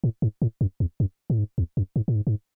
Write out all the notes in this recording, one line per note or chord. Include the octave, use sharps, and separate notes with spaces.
A2
G#2
A2
F#2
E2
F#2
A2
G#2
E2
F#2
G#2
A2
G#2
G#2